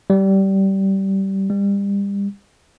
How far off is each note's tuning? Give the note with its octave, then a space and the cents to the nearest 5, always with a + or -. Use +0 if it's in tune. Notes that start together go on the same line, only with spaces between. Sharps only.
G3 -20
G3 +30